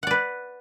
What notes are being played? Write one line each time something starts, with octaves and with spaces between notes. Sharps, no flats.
B4 D5 F#5